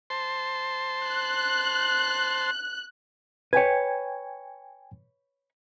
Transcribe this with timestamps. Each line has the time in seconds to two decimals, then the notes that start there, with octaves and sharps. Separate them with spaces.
0.10 C5 A5 C6
1.05 F#6
3.53 B4 C#5 G5 G#5 G#6